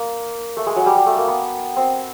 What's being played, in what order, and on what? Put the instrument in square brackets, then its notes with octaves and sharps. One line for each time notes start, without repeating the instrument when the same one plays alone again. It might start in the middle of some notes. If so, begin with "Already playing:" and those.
Already playing: [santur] A#3
A3
G#3
F#3
G3
G3
A3
A#3
B3
C4